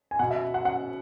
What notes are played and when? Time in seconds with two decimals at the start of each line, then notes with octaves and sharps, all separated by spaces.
0.11 G#5
0.19 B2 F#5
0.31 E5
0.54 F#5
0.65 F#5